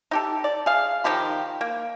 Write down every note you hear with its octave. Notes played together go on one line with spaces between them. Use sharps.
D#4 G4 A4
D5
G#4 F5
D#3 F3 G4 B5
A#3